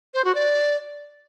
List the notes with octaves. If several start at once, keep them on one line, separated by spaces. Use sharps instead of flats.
C5
F#4
D5